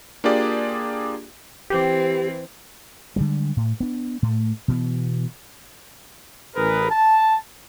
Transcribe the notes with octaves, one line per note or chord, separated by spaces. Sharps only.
A#3 D4 F4 G4 G#4 D5
E3 C4 G4
D3 G3 G#3
A2
B3 D4
A2 A3
B2 E3 B3
A1 G#4 A#4 B4
A5